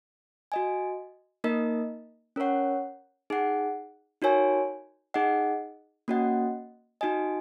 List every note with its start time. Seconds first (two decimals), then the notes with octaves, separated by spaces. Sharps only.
0.52 F#4 D#5 G#5
1.44 A#3 D#4 A#4 D#5
2.36 C#4 A#4 C#5 F#5
3.30 D#4 G#4 F#5
4.22 D#4 F#4 A#4 C#5 G#5
5.14 D#4 G#4 D#5 F#5
6.08 A#3 C#4 F#4 D#5 F#5
7.01 D#4 F#4 D#5 G#5